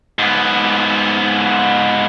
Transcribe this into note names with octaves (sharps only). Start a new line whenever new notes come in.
G#2 B3